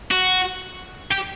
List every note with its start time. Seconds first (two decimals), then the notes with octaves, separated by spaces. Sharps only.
0.11 F#4
1.11 G4